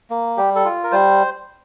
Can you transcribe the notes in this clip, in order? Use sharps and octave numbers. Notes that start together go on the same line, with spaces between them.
A#3
G3 G4
A4
F4
A#4
G3 C5